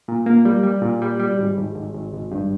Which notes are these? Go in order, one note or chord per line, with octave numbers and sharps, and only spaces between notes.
A#2
A#3
G3
G3
A#2
G3
G3
G#1
G#1
G#1
G#1
G#1
G2